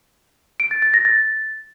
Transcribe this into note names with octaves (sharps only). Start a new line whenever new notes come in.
D7
A6
A6
A#6
A6